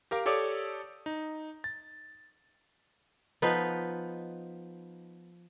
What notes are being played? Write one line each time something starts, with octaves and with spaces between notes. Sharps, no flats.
G4 A#4 F5 D6
G4 A4 C#5 D5 D6 D#6
D#4
A6
F3 B3 D#4 B4